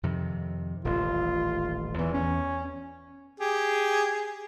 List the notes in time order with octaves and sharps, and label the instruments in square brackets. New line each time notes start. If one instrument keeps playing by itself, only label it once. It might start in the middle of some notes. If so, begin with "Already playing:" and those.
[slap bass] F2 C3 D#3
[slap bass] D#1 A1 [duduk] F4
[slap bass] E2 [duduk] E3
[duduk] C#4
[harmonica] G4 G#4